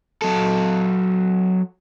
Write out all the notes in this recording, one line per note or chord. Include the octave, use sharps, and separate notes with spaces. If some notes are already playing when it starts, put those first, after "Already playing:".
F#3 A4